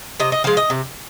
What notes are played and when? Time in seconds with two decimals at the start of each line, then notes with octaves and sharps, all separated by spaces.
0.20 C3 D#5
0.32 D#5
0.44 F3 G#3 F5
0.57 D#5
0.70 C3